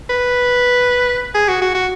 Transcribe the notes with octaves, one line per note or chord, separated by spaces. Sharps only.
B4
G#4
F#4
F#4
F#4